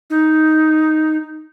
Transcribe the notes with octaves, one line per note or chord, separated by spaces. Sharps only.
D#4